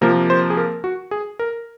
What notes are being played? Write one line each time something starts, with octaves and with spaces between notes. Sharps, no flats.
C3 F3 A#3 A#4
C5
G#4
A#4
F#4
G#4
A#4